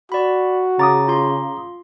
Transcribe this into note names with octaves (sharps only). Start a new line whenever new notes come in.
F#4 D5 B5
C#3 A#5 D6 D#6 A6
F4 C6